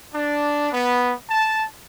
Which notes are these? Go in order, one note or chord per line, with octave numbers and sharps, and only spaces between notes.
D4
B3
A5